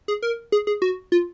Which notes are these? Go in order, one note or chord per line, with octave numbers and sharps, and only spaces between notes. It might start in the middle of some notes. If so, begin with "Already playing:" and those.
G#4
A#4
G#4
G#4
F#4
F4